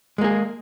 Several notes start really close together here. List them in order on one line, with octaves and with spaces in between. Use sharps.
G#3 A#3 G#4